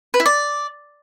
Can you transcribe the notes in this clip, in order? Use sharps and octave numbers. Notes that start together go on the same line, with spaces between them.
B4
E4
D5